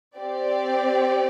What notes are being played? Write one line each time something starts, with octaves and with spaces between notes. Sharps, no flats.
C4 G4 D5